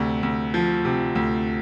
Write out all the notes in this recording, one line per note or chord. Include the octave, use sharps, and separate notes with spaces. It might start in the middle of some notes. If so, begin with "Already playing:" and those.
Already playing: D2 C3
D2
F3
C3
D2